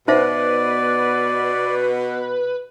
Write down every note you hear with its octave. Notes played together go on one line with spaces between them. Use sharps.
B2 D#4 B4 C5 D5 E5